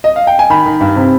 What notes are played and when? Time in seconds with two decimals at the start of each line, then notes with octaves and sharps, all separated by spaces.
0.04 D#5
0.16 F5
0.27 G5
0.39 G#5
0.50 D#3 B5
0.66 D#3
0.80 G2
0.96 C3